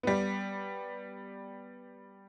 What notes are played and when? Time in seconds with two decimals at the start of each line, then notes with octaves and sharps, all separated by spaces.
0.03 G3 B3